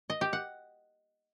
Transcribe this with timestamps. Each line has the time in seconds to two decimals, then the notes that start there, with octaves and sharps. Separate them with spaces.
0.10 D#5
0.21 G4
0.33 F#5